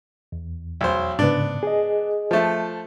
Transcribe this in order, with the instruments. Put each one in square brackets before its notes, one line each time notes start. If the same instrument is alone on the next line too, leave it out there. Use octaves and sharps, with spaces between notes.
[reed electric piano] E2
[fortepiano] B1 C5
[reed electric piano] G#2 C#3 [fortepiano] B3 D4
[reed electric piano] G#4 D#5
[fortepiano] F3 A3